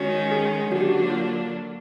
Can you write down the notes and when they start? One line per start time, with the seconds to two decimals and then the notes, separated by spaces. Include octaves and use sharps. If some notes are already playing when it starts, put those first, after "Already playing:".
Already playing: D#3 G#3 C#4 F#4
0.31 G#4
0.71 D3 F#3 A#3 D4 F#4
0.81 G4
0.89 F#4
1.10 F4